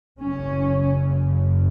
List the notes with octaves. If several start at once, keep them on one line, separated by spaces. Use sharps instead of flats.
F#1 F#2 C#3 C#4